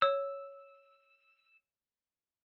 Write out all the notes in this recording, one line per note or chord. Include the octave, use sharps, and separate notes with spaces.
C#5 E6